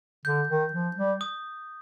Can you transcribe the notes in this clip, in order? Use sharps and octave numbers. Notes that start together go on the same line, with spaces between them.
D3 G6
D#3
F3
G3
D#6